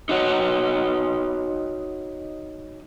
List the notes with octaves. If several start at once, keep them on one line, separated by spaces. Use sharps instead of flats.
D#4 F#4 C#5 D#5